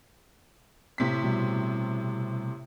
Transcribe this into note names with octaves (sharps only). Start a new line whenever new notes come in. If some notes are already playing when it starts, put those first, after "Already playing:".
A2 C3 B6
B2 G3